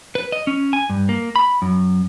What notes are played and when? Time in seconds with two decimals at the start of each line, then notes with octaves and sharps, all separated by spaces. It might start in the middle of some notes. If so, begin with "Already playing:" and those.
0.15 B4
0.32 D#5
0.47 C#4
0.73 G#5
0.90 G2
1.09 A#3
1.36 B5
1.62 F#2